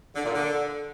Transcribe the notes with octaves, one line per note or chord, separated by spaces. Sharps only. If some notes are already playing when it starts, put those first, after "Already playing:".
D3
A#2
D3